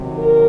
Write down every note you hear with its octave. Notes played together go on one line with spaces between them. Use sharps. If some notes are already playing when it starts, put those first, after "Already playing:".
Already playing: C3 D#3 F#3
A#4